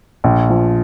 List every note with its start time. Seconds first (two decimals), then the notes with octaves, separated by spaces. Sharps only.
0.24 A#1
0.50 F3